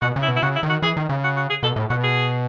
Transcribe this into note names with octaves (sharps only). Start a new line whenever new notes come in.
B2 F#4
C#3
E4
B2
E4
C#3 F#4
E4
D#3
F#4
E3 G#4
D#3
C#3
F#4
F#4
G#4
B2 A4
A2
B2 F#4
G#4